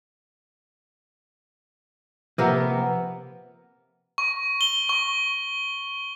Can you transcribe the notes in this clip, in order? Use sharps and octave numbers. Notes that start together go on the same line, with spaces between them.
C3 F3 A#3 A#4 B4 F#5
C#6
G7
C#6